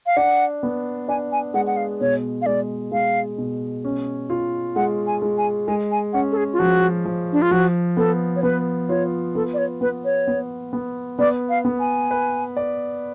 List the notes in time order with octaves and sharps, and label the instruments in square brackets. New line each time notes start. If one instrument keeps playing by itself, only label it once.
[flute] F5
[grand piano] D4 [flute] F#5
[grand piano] B3
[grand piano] D4 [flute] G#5
[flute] G#5
[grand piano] G#3 [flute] F#5
[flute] F#5
F5
[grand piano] B2 [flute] C#5
[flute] F5
[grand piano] G#3 [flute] D5
[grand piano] G#3 [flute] F5
[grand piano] B2
C#4
F4
[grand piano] G#3 [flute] F#5
[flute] G#5
[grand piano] G#3
[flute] G#5
[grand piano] G#3 [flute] G#5
[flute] G#5
[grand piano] C#4 [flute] F#5
[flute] A4
G#4
F4
[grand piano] F3 [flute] F#4
[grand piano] F3
[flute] D4
F4
[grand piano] F3 [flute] F#4
[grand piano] B3 [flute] A4
[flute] C#5
[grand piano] B3 [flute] B4
[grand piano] F4 [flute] C#5
[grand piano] B3 [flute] A4
[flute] D5
C#5
[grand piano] B3 [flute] B4
[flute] C#5
[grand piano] B3
B3
[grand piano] B3 [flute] D5
[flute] F5
[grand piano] B3
[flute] G#5
[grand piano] B4
D5